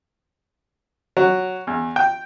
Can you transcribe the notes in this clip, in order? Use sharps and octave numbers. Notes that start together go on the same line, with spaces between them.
F#3
E2
G5